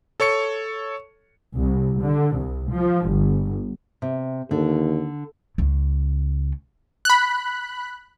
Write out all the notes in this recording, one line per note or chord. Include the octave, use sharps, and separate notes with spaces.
A4 C#5 C#6 C#7
C2
D3
C2
F3
G1
C3
D#2 D3
C#2 C#3
B5 F#6